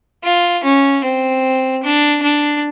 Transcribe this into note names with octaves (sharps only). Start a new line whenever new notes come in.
F4
C#4
C4
D4
D4